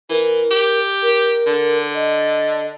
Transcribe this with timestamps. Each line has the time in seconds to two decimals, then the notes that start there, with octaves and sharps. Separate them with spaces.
0.10 E3 A#4
0.51 G4
1.02 A#4
1.47 D3
1.95 D#5